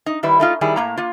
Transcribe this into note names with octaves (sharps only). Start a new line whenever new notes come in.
D#4
D#3 G3 E4 B4
A3 D#4 F4
D#3 G3 E4 G#4
A2 A#3 A#5
A#3 F4